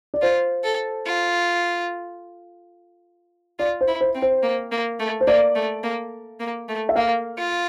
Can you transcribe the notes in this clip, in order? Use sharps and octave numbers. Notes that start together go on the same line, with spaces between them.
D5
F4 C5
A4
F4
F4 D5
C5
E4
C5
C4
C5
A#3
A#3
A3
C5
A#3 D5
A3
A#3
A#3
A3
E5
A#3 F5
F4